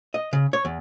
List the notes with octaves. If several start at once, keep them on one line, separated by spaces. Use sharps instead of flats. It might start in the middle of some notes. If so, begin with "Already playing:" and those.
D#5
C#3
C#5
E2